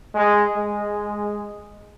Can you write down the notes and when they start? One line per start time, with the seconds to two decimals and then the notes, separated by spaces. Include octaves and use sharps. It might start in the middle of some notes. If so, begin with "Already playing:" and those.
0.15 G#3
0.55 G#3